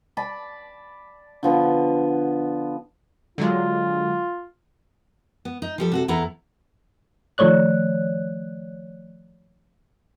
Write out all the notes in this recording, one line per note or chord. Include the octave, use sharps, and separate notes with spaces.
D5 A5 B5
D3 F3 B3
D3 F#3 G#3 F4
B3
D#4
F3 G3 A4
C3 F#4 A4
E2 B3 E4 A4 A#5
D#3 F3 A3 C#5 D5 F#6